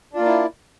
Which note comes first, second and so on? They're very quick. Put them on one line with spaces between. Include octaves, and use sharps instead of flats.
D4 F4 A#3 D5 E4